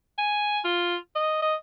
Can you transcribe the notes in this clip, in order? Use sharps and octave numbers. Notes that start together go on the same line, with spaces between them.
G#5
F4
D#5
D#5